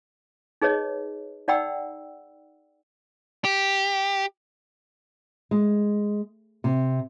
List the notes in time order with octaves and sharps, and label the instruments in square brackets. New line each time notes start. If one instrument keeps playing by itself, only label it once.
[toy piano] D#4 G#4 B4 C#5 D#5
D#4 D5 F#5 G5 B5 E6
[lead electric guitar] G4
[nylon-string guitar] G#3
C3